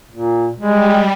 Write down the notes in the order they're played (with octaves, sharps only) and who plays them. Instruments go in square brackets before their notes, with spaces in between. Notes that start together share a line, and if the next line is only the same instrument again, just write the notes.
[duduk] A#2
[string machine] G3 [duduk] G#3